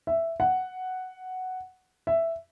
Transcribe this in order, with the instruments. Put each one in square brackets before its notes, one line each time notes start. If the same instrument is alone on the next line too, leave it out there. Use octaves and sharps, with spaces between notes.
[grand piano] E5
F#5
E5